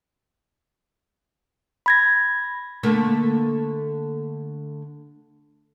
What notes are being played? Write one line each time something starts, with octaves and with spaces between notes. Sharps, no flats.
B5 G#6 A#6
D3 A3 A#3